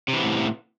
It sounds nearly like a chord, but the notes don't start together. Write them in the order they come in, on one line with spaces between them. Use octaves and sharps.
C3 E3 B3 A2